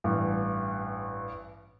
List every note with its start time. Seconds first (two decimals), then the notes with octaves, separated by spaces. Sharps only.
0.04 A1 G2